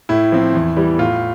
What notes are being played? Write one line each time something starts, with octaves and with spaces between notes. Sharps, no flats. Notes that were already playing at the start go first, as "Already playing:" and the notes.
A2 E4
F3 C4
E2
E3 G3
A2 F4